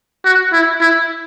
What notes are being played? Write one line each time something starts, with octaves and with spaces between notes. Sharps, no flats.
F#4
E4
E4